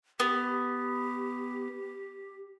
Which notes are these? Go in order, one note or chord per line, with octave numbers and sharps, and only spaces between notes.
B3 G4